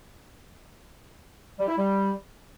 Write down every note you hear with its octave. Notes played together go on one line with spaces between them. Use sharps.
G3
E4
G3